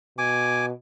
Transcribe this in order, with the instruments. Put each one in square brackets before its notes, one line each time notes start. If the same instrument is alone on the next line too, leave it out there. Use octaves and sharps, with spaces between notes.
[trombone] B2 [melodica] G#5 D6